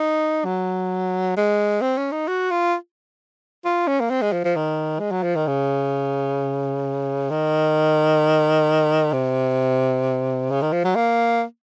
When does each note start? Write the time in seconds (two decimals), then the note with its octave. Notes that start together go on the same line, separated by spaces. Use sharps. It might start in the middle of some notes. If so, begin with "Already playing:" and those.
Already playing: D#4
0.45 F#3
1.37 G#3
1.82 C4
1.98 C#4
2.12 D#4
2.28 F#4
2.51 F4
3.65 F4
3.87 C#4
4.00 A#3
4.10 C4
4.22 G#3
4.33 F3
4.44 F3
4.56 D#3
4.99 G#3
5.11 F#3
5.23 F3
5.36 D#3
5.47 C#3
7.30 D#3
9.13 C3
10.50 C#3
10.62 D#3
10.73 F3
10.84 F#3
10.95 A#3